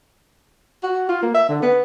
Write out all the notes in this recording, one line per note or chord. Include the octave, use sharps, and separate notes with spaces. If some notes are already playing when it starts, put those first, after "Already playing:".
F#4
F4
A#3
E5
D3
B3